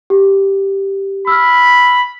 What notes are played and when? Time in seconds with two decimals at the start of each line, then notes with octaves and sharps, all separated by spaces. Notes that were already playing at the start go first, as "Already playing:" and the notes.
0.10 G4
1.27 B5 E6 F6